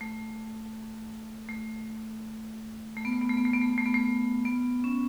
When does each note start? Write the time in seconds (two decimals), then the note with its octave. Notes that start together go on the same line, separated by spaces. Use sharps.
0.01 A3
1.49 A3
2.97 A3
3.05 B3
3.13 A3
3.21 B3
3.29 A3
3.37 B3
3.45 A3
3.53 B3
3.61 A3
3.70 B3
3.78 A3
3.86 B3
3.94 A3
4.45 B3
4.84 C#4